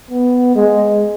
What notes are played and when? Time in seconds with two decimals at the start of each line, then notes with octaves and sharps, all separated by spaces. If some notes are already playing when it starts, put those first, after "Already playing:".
0.11 B3
0.55 G#3